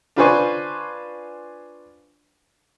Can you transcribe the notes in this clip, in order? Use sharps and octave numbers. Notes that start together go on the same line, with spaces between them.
D4 F4 B4 C5 G#5 C#6